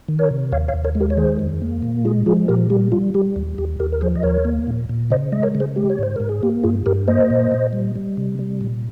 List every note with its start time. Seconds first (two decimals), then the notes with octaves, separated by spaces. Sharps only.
0.08 D#3
0.19 A#4 C#5
0.31 C3
0.52 D#2 C#5 F5
0.68 C#5 F5
0.74 D#2
0.85 A#4 C#5
0.95 G#3
1.00 G4 A#4
1.10 C#5
1.17 D#3 G#4 C5
1.39 F2
1.62 A#3
1.82 A#2
2.05 G#3 F4 G#4
2.26 F3 F4 G#4
2.48 A#2 G4 A#4
2.70 G3 G4
2.92 G3 F4
3.14 G3 G4
3.36 D#2
3.58 D#2 G4
3.80 D#2 G4 A#4
3.92 A#4
4.01 F3 G#4 C5
4.15 D#5
4.23 D#2 A#4 C#5
4.45 A#3
4.67 A#2
4.89 A#2
5.10 C#3 C5 D#5
5.32 G#3 D#5
5.43 A#4 C#5
5.55 C#3
5.60 G#4 C5
5.76 G#3 G4
5.90 C#5
5.99 G#2 C5
6.16 G#2 A#4
6.29 G#4
6.43 A#3 G4
6.63 G2 F4 G#4
6.86 G2 G4 A#4
7.08 A#3 C5 D#5
7.30 A#2
7.51 A#2
7.73 G3
7.95 G3
8.17 C3
8.39 G3
8.61 A#2